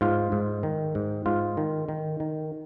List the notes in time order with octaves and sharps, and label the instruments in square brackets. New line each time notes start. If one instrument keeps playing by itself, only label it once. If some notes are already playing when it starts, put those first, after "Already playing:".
[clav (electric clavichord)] G#2 F4
G#2
D#3
G#2
G#2 F4
D#3
D#3
D#3